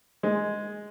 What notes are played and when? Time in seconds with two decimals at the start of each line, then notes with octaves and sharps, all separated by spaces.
0.23 G#3